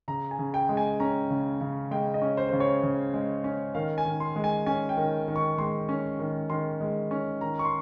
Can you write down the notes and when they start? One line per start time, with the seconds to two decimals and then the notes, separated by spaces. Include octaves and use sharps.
0.08 C#3 A#5
0.31 G#5
0.39 C#3
0.54 G5
0.69 G#3
0.77 G#5
1.00 C#4 A#5
1.30 C#3
1.61 C#3
1.91 G#3 G5
2.14 D#5
2.22 C#4
2.37 C5
2.49 C#3 C5
2.60 C#5
2.83 C#3
3.14 G#3
3.44 C#4
3.75 D#3 F5
3.98 G#5
4.05 D#3
4.20 C6
4.36 G#3
4.44 G#5
4.66 C#4 G#5
4.89 G5
4.97 D#3
5.28 D#3
5.36 C#6
5.58 G#3 C6
5.89 C#4
6.19 D#3
6.50 D#3 C6
6.81 G#3
7.11 C#4
7.41 D#3 A#5
7.59 C#6
7.65 C6